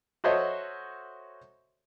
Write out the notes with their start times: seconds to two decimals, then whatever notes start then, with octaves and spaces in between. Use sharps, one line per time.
0.24 F#4 A4 C5 C#5 D#5 E5